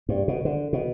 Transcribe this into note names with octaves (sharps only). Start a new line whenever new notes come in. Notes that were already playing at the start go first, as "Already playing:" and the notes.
G2
B2
D3
B2